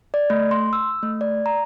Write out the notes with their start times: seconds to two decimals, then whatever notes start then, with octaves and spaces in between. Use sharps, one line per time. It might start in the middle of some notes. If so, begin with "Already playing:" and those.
0.14 D5
0.30 A3
0.51 C6
0.73 E6
1.03 A3
1.21 D5
1.46 A#5